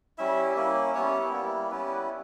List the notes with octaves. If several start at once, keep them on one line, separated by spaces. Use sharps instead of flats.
G3 C#4 E4 E5
A#3 C#4 E4
G3 B3 C#4 E4 C#5
G3 A#3 E4
G3 B3 C#4 E4 B4